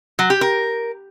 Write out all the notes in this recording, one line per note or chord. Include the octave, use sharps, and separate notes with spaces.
F#3
G4
A#4